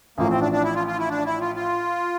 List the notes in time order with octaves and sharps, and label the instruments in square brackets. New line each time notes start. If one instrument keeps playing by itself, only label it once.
[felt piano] A1 A2 F3 [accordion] A#3
[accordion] C4
D4
D4
E4
F4
F4
E4
D4
E4
F4
F4